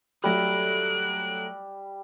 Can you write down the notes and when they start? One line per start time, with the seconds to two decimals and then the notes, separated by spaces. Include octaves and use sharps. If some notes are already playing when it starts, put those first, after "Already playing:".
0.24 F#3 G3 A3 F#6 D7